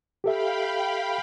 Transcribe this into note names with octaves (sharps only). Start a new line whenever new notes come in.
G4 A4 E5 F5 G5 B5